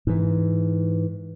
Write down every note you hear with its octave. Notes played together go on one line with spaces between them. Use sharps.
G#2 E3